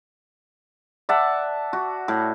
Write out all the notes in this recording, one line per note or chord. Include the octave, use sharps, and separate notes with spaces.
D5 E5 F#5 A5
F#4
A2